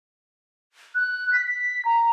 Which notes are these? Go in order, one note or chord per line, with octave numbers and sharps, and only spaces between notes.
F#6
B6
B6
A#5